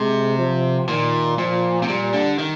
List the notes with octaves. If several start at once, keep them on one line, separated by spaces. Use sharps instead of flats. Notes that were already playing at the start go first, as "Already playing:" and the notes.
Already playing: C3 G#3
F3
A#2 D#3
A#2 F3
C3
A#2 G3
D3
D#3